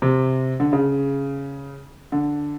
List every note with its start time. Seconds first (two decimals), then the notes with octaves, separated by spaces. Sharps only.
0.02 C3
0.60 D3
0.73 C#3
2.12 D3